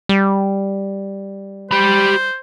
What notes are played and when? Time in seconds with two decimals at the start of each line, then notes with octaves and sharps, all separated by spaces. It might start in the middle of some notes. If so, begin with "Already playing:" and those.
0.09 G3
1.71 G4 C5 B5